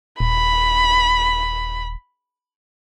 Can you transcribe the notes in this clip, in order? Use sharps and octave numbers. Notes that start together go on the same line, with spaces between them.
D#1 B5